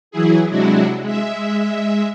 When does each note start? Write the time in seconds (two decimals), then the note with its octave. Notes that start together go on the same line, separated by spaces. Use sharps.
0.11 E3 F#3 E4 G#4
0.50 C3 F#3 G#3 D4 E4 F#4
1.02 G#3 E5